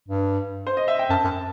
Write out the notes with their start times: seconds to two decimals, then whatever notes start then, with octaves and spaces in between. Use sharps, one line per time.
0.08 G2
0.67 C5
0.77 D#5
0.88 E5
0.99 G5
1.10 F#2 A5
1.24 F#2